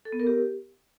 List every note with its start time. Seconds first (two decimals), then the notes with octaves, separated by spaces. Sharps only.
0.05 A4
0.12 B3
0.20 A#4
0.27 G4